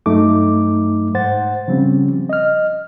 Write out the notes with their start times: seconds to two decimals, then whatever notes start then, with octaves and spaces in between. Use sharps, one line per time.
0.06 G2 F#3 A3 D#4 D6
1.14 G#2 C5 F#5 A6
1.68 C#3 F3 G3 C4 C#4
2.29 D#5 F6